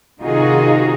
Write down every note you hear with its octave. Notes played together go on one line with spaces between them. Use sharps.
C3 D#3 D#4 F4 F#4 G#4